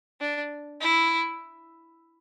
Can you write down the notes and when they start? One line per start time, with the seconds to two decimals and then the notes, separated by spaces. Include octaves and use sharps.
0.21 D4
0.81 E4